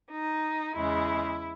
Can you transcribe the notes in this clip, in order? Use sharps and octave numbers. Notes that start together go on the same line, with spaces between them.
D#4
E2 C#3 G#3 E4